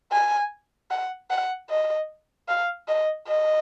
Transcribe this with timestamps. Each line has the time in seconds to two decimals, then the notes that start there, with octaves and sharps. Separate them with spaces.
0.12 G#5
0.91 F#5
1.30 F#5
1.70 D#5
2.48 F5
2.88 D#5
3.27 D#5